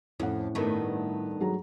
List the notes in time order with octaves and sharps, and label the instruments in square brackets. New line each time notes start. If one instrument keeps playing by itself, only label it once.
[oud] F2 [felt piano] A2 C#4 F#5
[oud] G2 A3 [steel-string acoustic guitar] D#3 B3
[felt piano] F#3 G#4 A#5